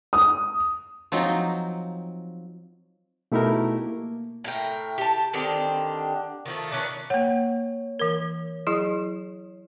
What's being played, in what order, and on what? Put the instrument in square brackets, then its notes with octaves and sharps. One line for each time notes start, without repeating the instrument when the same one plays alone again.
[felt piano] D#6
[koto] F3 F#3 C4 D#4
[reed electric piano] B2 A3 D#4 E4 G4 A#4
A#3
[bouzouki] A2 A#4 G5
G4 A5
D3 D#3 C4 G4
D#3 F3 A3
D#3 C#4 B4 D5
[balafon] A#3 F#5 [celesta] C#5
[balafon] E3 A#4
F#3 E4 G#4